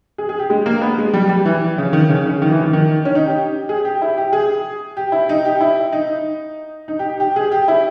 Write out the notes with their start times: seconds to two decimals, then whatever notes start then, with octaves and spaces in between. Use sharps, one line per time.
0.18 G#4
0.29 G#4
0.39 G4
0.50 G#3
0.66 A#3
0.82 B3
0.98 G#3
1.14 G3
1.29 G3
1.45 E3
1.78 C#3
1.93 D#3
2.09 C#3
2.26 C#3
2.42 D#3
2.51 E3
2.62 D#3
2.73 D#3
3.05 C#4
3.15 D#4
3.26 G4
3.69 G#4
3.85 G4
4.02 E4
4.17 G4
4.33 G#4
4.97 G4
5.12 E4
5.29 D#4
5.45 G4
5.61 E4
5.93 D#4
6.88 D#4
6.99 G4
7.10 G4
7.20 G4
7.36 G#4
7.52 G4
7.68 E4